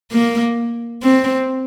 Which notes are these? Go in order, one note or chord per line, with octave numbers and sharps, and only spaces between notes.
A#3
C4